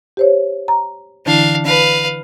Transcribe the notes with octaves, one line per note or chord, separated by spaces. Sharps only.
G4 C5 C#5
A#5
D3 E3 D4 E4 F5
B4 F5